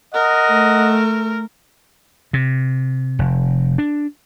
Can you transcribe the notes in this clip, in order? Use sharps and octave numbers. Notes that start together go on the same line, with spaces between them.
A#4 D#5 F#5
A3
C3
F1
D4